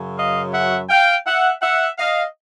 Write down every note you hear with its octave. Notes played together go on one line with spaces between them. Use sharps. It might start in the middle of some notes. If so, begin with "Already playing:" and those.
Already playing: F#2 C#3 F#3
D#5 F5
E5 F#5
F5 G5
E5 F#5
E5 F#5
D#5 F5